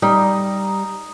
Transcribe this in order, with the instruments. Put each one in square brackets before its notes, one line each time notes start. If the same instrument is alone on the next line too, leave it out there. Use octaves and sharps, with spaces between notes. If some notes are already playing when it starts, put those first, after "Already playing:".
[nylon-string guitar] G3 [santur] D#4